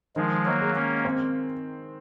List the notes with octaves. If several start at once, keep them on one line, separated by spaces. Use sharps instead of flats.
D#3 F3 G#3
F#3 A#3
G#3
A#3 C#4
C4